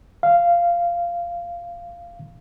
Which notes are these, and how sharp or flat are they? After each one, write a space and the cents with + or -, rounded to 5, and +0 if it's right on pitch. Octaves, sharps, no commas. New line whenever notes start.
F5 -15